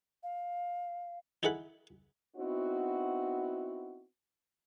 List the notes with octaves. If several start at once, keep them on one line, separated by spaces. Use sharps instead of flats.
F5
D#4 E4 G#4 A4 F#5 B5
B3 C4 D#4 E4 F#4